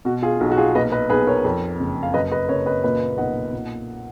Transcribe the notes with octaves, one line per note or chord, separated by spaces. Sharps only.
B2 F#4
F4 G#4
B1 F#4
F#4
F4 G#4
A#2 B4 D#5
B4 D#5
B1 G#4 B4
A#4 C#5
F2
F#1
F5
F#2 B4 D#5
B4 D#5
F#1 A#4 C#5
B4 D#5
A#2 B4 D#5
B1 D#5 F#5
A#2